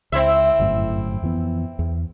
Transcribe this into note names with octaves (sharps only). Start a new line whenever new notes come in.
C#2 C4 E4 E5
G1 F#2 A2
F2 E3 B3
E2